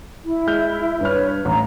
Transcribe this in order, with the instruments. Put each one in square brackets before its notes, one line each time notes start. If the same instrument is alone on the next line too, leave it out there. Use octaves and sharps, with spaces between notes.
[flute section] E4
[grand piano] G#3 F6 G6
[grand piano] G2 F6 [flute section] B4 C#5
[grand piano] A1 [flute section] A#5